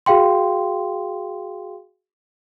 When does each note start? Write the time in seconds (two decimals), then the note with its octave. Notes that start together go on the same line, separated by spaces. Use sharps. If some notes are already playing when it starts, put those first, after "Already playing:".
0.06 F#4 G#4 F5 G5 C6